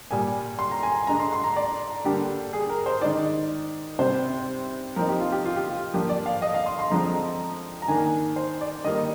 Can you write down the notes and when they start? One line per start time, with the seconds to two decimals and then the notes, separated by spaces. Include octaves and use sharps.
0.11 A#2 G3 A#3 G#5
0.59 C6
0.71 A#5
0.83 G#5
1.07 D3 G#3 D4 A#5
1.20 C6
1.33 C6
1.44 A#5
1.56 D5
2.04 D3 G3 A#3 D4 G4
2.53 G#4
2.70 A#4
2.86 C5
3.01 D#3 G#3 D#4 D5
3.99 C3 G3 C4 C5
4.96 F3 C4 D#4 A#4
5.09 G4
5.20 F4
5.32 G4
5.45 F4
5.56 G4
5.69 F4
5.94 F3 A#3 D4 G4
6.09 D5
6.26 F5
6.42 D#5
6.54 F5
6.66 C6
6.79 C6
6.90 D3 F3 G#3 C4 A#5
7.82 A#5
7.88 D#3 A#3 D4 G#5
8.36 C5
8.61 D5
8.84 D#3 G3 A#3 D#4 D#5